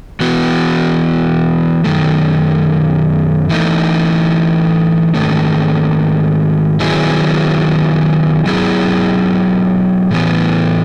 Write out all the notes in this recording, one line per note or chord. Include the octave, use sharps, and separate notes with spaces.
E3 B3 F#4
F#2 D#3 A3
E3 A3 D#4
G#2 D#3 A3
D#3 F#3 B3 E4 G#4
F#3 B3 E4 G#4
A2 E3 B3